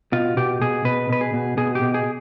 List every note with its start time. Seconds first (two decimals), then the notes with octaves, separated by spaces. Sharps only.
0.12 B2 F4
0.37 B2 G4
0.62 B2 G#4
0.85 B2 B4
1.09 B2 B4
1.21 G#4
1.34 B2
1.57 B2 G#4
1.75 G4
1.81 B2
1.94 G#4